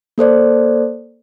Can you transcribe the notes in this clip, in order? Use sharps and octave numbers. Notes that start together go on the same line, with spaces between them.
A#3 A4 C5 D5